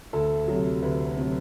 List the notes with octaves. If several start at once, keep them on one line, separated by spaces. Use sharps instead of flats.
D2 A4
C3 F#3
D2 B4
C3 F#3